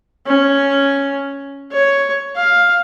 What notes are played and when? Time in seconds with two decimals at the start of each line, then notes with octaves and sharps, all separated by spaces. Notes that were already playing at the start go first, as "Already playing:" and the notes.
0.26 C#4
1.71 C#5
2.36 F5